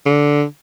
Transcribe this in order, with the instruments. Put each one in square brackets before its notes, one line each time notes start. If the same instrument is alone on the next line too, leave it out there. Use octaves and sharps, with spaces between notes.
[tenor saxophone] D3